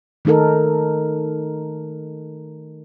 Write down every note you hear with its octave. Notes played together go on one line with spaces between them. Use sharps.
D#3 A3 D#4 A4 A#4